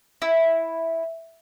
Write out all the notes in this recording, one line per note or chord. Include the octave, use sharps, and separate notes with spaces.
E4